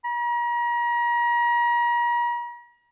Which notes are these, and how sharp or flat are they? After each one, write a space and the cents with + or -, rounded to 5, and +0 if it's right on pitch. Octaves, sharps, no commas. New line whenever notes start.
A#5 +40